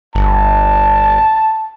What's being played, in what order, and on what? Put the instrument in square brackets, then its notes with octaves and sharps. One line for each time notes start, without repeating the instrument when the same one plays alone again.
[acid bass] G1 [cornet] A5